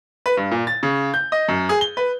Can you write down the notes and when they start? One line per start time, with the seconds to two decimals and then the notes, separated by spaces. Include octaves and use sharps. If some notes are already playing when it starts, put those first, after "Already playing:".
0.26 B4
0.37 G2
0.51 A#2
0.67 A6
0.83 C#3
1.14 G6
1.32 D#5
1.49 F#2
1.69 G#4
1.81 G7
1.97 B4